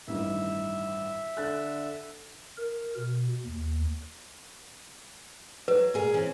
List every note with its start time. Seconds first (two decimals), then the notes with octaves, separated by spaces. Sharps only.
0.08 A1 G2 D#3 E5
1.37 D3 F#6 A6
2.58 A#4
2.97 B2
3.46 D#2
5.68 F#3 B4
5.94 A#2 G#4 A#4
6.14 E3 C4 C#4